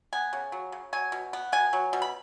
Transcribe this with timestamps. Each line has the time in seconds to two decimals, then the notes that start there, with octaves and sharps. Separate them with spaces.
0.13 B3 G#5
0.33 C#3
0.52 F#3
0.72 C#3
0.93 F#3 G#5
1.12 B2
1.33 B3
1.52 B2 G#5
1.73 F#3
1.93 B2
2.02 B5